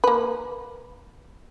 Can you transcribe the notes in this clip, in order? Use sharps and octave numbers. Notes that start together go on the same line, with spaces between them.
A#3 B4